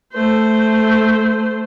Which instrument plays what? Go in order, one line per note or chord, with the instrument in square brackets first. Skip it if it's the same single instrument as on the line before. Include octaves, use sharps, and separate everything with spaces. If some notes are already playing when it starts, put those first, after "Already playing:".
[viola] A3 C5